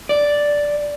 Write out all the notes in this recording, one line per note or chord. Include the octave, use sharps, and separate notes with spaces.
D5